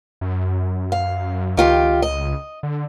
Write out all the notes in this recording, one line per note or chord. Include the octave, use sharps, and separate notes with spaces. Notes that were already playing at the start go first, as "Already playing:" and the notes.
F#2
F5
C#2 D#3 F4 G4
D#5
D3